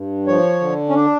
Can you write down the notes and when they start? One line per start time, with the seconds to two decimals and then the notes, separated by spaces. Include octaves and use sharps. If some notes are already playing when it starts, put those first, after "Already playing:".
Already playing: G2
0.27 F3 C#5
0.61 D3
0.89 C#4
0.95 D4